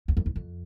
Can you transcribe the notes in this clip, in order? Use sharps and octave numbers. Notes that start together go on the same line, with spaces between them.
E2
F2
E2
F2